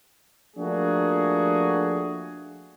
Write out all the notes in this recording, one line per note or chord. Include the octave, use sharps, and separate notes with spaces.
F3 A3 A#3 D4 F#4 G#4